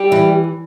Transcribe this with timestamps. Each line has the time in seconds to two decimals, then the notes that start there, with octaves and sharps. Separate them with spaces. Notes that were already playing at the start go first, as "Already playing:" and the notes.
Already playing: G3 G4
0.12 E3